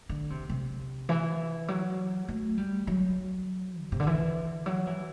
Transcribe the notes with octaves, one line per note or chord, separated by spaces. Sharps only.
D3
C3
C3
E3
F#3
A3
G3
F#3
B2
C3
D3
E3
F#3
E3